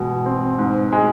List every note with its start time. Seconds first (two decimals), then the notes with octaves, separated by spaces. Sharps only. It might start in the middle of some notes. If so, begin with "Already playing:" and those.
Already playing: E2 B2 G#3
0.26 C4
0.59 G#2
0.92 G#3